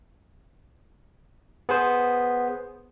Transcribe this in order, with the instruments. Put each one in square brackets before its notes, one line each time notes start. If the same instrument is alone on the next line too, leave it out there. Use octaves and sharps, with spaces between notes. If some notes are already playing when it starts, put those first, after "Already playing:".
[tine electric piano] B3 G#4 C5